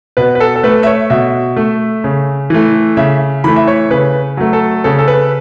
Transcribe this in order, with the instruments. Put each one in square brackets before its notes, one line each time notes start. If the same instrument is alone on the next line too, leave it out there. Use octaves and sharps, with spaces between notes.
[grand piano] B2 B4
B4
A4
A4
A3 B4
E5
C#5
B2 E5
A3
C#3
E3 A3
C#3 E5
E3 A3 B5
E5
C#5
C#3 B4
F#3 A3
A4
C#3 A4
A4
B4